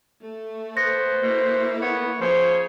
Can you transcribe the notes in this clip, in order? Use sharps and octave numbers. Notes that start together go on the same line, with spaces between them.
A3 A4
B3 C5 A#6
B2 A#3 E4 A4
B3 C#5
C#3 F3 C5 C#5